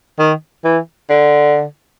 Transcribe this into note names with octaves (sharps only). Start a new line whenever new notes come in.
D#3
E3
D3